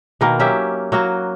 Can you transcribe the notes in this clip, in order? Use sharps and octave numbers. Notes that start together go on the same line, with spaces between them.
B2 D#3 A#3
F#3 C#4 G4 E5
F#3 A#3 F#4